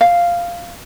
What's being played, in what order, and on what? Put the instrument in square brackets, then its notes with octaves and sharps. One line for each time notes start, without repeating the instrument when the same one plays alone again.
[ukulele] F5